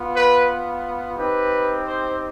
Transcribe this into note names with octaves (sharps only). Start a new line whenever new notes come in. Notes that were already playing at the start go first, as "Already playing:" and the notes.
Already playing: B3 F4
B4
C4 D#4 G4 B4
C5